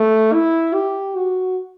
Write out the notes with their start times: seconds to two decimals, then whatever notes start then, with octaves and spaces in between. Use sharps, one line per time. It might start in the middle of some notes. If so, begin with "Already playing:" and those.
Already playing: A3
0.33 E4
0.74 G4
1.16 F#4